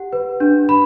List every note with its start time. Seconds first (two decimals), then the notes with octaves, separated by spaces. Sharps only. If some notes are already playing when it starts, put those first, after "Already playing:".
Already playing: G4 F#5
0.13 B4
0.40 D4
0.69 B5